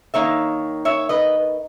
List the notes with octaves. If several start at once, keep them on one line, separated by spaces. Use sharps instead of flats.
D#3 A#3 D#4 C#5 E5
C#5 E5
B4 D#5